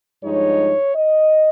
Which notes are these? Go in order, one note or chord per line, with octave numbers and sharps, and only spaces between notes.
G2 F3 G#3 D#4 C#5
D#5